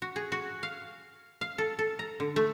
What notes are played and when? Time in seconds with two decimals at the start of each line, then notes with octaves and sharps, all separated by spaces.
0.02 F#4
0.16 G#4
0.32 F#4
0.63 F5
1.41 F5
1.58 A4
1.79 A4
1.99 A#5
2.20 D3
2.36 A3